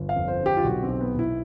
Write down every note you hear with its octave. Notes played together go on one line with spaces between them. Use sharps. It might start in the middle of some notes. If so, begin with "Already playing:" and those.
Already playing: G1
F5
F2
C5
D3
G4
F4
B1 F#4
C4
B1
B3
B1 E4